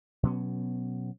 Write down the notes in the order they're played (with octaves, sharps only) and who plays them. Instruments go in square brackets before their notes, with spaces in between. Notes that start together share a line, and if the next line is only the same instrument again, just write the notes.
[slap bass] B2 F#3 B3 C#4